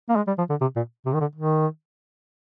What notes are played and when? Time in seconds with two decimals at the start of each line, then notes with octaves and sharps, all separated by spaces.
0.09 A#3
0.16 G#3
0.27 G3
0.38 F3
0.50 D3
0.61 C3
0.76 A#2
1.06 C3
1.14 D#3
1.21 D3
1.35 D#3